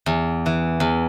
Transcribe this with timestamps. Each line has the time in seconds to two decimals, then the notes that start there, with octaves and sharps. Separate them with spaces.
0.06 E2
0.46 E3
0.80 E2